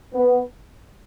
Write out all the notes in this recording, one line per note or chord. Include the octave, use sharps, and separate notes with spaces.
B3